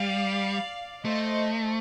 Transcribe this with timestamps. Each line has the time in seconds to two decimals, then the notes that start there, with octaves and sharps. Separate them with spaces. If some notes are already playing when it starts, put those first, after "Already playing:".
Already playing: G3 D5 F5
1.05 A3 C5 D#5